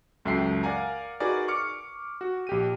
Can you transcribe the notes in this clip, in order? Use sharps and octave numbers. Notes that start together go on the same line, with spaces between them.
C#2 F#2 A4 E5 G5 C7
A#4 D5 F5 F#5 G#5 A#5
D#4 F#4 G#4 A#4 B4 D5
C#6 D6 F6 C#7
F#4
A#1 G4 D#7